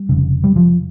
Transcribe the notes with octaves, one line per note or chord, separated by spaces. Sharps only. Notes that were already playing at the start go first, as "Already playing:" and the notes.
Already playing: G3
F1 D#2 C#3
G3
F3